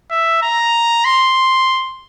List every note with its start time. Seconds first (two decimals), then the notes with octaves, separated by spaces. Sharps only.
0.11 E5
0.42 A#5
1.05 C6